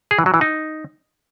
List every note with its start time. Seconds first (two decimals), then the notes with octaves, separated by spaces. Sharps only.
0.11 G#4
0.19 E3
0.26 F#3
0.34 E3
0.41 D#4